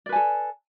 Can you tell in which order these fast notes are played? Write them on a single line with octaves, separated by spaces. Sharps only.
D5 B4 G#5 A4